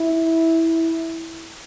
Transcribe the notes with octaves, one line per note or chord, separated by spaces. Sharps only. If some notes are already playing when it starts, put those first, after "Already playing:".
Already playing: E4